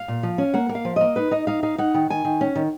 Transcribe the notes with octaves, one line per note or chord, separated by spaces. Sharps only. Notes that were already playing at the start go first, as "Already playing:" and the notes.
Already playing: F5
A#2
F3
C#4
A#3 F#5
A#3
F5
F3
A#3 D#5
D#4 B4
D#4 D#5
D#4 F5
D#4 F5
D#4 F#5
D#3
D#3 G#5
D#3
C#4
D#3